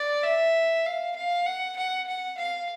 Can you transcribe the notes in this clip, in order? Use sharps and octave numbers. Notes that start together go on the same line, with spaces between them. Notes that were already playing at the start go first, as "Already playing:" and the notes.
Already playing: D5
E5
F5
F5
F#5
F#5
F#5
F5